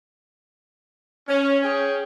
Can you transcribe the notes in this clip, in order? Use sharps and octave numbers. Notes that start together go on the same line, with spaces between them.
C#4
G#4 C#5 G5